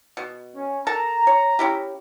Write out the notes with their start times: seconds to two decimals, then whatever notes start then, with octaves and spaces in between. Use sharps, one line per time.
0.17 B2
0.55 C#4
0.87 A4 A#4 A5 A#5
1.27 C#5
1.59 C#4 E4 G4